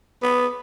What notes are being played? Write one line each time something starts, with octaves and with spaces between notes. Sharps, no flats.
B3